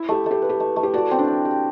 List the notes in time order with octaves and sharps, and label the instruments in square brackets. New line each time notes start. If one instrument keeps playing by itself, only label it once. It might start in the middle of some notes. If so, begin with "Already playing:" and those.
Already playing: [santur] E4
[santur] A3 [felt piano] G4
[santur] A3 [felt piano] G4
[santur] B4
[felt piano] G4
[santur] A3
A3
[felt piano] G4
[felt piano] F#4 [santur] D5
[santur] C4
[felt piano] D4
[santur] D5
G4